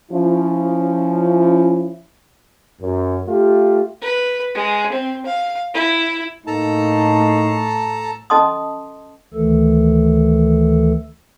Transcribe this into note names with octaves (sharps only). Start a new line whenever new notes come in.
F3 C#4 E4
F#2
A3 F4 G4
B4
G#3
C4
F5
E4
A2 G#3 A#3 D#4 A4 A5 A#5
C#4 A4 D#5 A5 C6 D#6
D2 D#3 E3 A3 A4